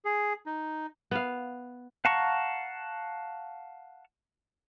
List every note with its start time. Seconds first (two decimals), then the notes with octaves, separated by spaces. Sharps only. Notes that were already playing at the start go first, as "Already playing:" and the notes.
0.05 G#4
0.46 D#4
1.11 B3 F5
2.05 F5 F#5 A5 A#5 C#6